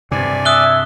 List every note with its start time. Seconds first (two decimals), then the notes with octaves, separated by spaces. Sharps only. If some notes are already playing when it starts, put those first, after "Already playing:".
0.11 G2 C3 D5 G#5
0.45 E5 D#6 F#6 G7